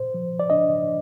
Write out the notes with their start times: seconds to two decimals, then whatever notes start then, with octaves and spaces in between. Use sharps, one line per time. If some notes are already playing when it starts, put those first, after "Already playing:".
Already playing: A#2 C5
0.14 F3
0.40 D5
0.50 D4 D#5